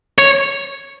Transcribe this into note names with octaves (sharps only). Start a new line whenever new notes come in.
C#5